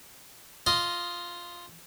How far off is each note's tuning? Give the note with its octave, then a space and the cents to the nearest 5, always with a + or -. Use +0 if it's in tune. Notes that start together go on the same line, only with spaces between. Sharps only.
F4 +0 D#5 +0